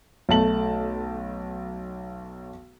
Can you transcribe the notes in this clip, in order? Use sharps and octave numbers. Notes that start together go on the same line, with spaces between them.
B1 A3 A5 F#7